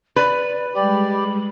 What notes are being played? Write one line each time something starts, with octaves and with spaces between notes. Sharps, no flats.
B4 D5
G3 G#3 G4 D5 B5